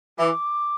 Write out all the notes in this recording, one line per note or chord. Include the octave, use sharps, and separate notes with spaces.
E3 D6